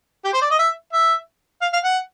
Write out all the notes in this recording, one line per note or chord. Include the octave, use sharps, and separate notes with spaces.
G4
C5
D5
D#5
E5
E5
F5
F5
F#5